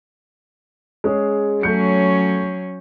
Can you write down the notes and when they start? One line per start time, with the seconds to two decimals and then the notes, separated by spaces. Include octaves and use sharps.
1.04 G#3 C#4 G#4
1.63 F#3 A3 C#4 G6 C#7